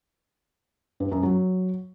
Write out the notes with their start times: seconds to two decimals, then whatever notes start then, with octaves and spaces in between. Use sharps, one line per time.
1.00 G2
1.12 F#2
1.23 F#3